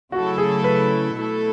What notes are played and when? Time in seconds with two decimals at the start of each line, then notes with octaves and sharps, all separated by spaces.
0.12 C#3 F#3 A3 E4 F#4 A4
0.38 G#4
0.64 B4
1.16 B2 A3 E4 A4